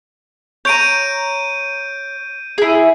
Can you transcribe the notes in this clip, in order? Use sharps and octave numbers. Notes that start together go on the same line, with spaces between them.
C#5 A#5 G6 D7 D#7
E4 G#4